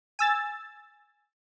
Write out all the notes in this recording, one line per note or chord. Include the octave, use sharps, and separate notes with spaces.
G#5 E6 A6